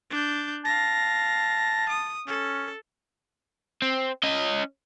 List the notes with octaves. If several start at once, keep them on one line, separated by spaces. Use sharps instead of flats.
D4 G6
F5 A5 A#6
D#6
C#4 A4
C4
C#4 D#5